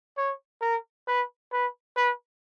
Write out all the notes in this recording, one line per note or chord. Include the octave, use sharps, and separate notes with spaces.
C#5
A#4
B4
B4
B4